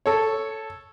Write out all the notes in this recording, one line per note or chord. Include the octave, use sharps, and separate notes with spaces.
A4 C#5